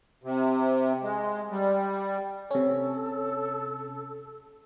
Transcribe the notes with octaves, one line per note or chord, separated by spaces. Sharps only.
C3
G#3
G3
C3 C#4 A4